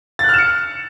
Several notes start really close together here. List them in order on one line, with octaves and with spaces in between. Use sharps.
A6 F#6 F6 E7 C#7